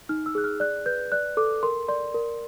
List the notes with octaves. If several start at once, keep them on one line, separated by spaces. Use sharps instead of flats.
D#4 F6
E6
G#4 F#6
F6
D5 F#6
B4 G6
D5 F#6
A4 D6
A#4 C6
D5 C6
A#4